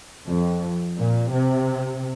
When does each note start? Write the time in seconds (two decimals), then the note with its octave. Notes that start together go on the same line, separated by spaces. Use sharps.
0.28 F2
0.98 A#2
1.32 C3